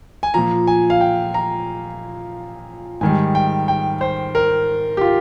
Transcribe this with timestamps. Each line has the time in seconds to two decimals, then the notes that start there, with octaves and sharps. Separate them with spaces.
0.23 G#5
0.34 A#2 F3 A#5
0.67 G#5
0.90 F5
1.01 G5
1.34 A#5
3.01 G#2 D#3 G3 G#5
3.35 G5
3.68 G5
4.01 C5
4.35 A#4
4.97 G4
5.01 F4